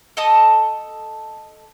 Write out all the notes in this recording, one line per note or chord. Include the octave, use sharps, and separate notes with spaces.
A4 D#5 A5 D#6